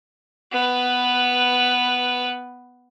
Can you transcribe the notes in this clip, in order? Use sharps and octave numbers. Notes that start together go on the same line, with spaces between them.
B3 B4